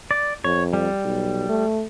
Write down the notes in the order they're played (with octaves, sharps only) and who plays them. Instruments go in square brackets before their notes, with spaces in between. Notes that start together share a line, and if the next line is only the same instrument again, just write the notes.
[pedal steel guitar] D5
[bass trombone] F2 [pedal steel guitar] C#5
[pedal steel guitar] G3
[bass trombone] B1
A3